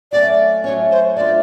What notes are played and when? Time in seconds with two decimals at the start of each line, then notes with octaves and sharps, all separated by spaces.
0.12 F#3 A3 C#4 D5
0.64 F#3 A3 C#4 C#5
0.91 C5
1.16 A3 D4 F4 D5